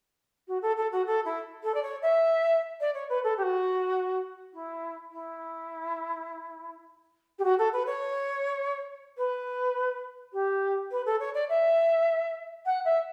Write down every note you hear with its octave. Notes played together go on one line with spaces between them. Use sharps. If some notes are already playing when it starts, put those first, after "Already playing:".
F#4
A4
A4
F#4
A4
E4
A4
D5
C#5
E5
D5
C#5
B4
A4
G4
F#4
E4
E4
G4
F#4
A4
B4
C#5
B4
G4
B4
A4
C#5
D5
E5
F#5
E5